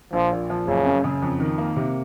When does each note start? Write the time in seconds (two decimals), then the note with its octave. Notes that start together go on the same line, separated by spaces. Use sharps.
0.13 A#1 F3
0.32 A#2
0.50 F3
0.67 F#1 C#3
0.86 F#2
1.04 C#3
1.22 F2
1.40 D#3
1.58 A#3
1.76 C3